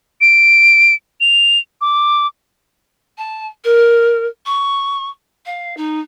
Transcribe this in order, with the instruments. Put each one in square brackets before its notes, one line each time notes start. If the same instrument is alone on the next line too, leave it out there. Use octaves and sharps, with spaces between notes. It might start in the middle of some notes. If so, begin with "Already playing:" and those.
[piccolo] D7
F7
D6
[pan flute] A5
A#4
C#6
F5
D#4